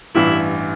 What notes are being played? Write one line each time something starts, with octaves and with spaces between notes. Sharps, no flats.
A1 G2 E3 E4